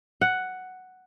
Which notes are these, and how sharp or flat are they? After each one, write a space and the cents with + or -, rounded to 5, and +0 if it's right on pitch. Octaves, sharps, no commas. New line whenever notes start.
F#5 +5